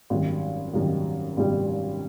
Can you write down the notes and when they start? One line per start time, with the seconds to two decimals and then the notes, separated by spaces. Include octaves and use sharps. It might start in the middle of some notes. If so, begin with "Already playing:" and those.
0.10 G#1 F#2 D#3 G3
0.73 G#1 F#2 D#3 G3
1.37 G#1 F#2 D#3 G3